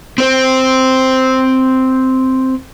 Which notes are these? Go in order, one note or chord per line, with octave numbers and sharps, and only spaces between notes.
C4 C5